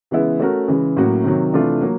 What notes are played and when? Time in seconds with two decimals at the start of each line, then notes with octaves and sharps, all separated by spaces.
0.11 C#3 E3 G#3 B3 E4
0.40 A3 C#4 F#4 A#4
0.68 C#3 E3 G#3
0.97 A2 F#3 A#3 C#4 F#4
1.24 C3 D#3 F#3
1.52 C3 E3 A3 D4 F4
1.81 F#3 A#3